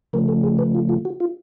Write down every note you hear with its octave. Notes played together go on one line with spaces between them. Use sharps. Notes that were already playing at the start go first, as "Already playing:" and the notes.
C#3 F3 A3 A#4
A4
G#4
B4
F4
F4
F#4
F4